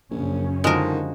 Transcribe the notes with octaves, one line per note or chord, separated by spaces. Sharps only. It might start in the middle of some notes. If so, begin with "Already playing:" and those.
A#1 F#2 C#3 C#4
D3 D#3 F3 G#3 F#4 A#4